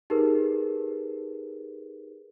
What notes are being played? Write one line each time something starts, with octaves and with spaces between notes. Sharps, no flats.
D#4 G4 G#4 A#4 B4